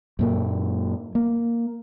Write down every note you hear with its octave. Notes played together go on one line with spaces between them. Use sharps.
F#2 A#2 A#3
A#3